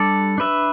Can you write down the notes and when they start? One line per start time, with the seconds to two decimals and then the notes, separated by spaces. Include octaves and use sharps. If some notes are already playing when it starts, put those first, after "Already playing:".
Already playing: G3 D4 A4 D5
0.38 D4 B4 E5